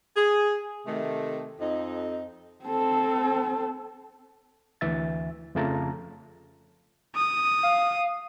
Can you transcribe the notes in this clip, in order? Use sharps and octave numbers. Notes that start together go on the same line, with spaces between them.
G#4
C3 D#3 A3
F2 D#4
C4 A4
D2 E3 E5 A6
F2 C#3 A3 F4 A5 A#5
D#6
F5